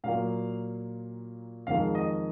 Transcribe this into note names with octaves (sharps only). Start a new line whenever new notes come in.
A#2 F#3 A#3 F5
F2 D#3 G#3 F5
D#5